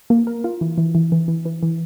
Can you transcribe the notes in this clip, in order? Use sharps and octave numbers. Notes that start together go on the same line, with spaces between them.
A#3
A#4
F4
E3
E3
E3
E3
E3
E3
E3